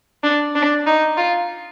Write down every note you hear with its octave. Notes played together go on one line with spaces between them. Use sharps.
D4
D4
D#4
F4